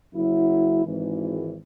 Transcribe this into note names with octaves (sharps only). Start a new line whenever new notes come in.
F#1 F#2 F#3 E4
G#1 G#2 E3